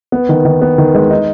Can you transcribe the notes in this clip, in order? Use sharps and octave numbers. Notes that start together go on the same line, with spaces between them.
B3
D#3
D#3
B3
D#3
G#3
D#4